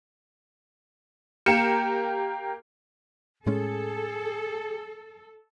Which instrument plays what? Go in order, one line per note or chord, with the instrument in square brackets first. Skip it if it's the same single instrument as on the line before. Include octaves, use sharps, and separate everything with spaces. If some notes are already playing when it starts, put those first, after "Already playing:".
[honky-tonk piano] A#3 G4 A#4 C#7 E7
[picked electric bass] A2 G#3 C#4 [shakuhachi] G#4 [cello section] A4